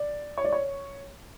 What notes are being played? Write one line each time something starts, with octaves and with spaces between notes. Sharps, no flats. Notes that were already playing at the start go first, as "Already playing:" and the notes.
Already playing: D5
C#5
D5
C#5